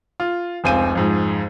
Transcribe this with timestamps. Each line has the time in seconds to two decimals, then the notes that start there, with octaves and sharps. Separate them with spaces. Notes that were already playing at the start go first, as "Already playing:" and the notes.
0.20 F4
0.64 F1 C#2 C4 G#5 D#7
0.95 F2 G#2